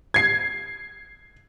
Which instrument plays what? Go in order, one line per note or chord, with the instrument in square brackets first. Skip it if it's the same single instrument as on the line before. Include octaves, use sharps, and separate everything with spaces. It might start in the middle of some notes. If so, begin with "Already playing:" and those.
[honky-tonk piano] G#6 C7